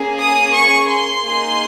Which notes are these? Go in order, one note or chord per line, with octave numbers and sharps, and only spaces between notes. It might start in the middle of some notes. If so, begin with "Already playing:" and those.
Already playing: A#3 C#4 G#4
D#6
C#6
C6
A#3 D#4 G#4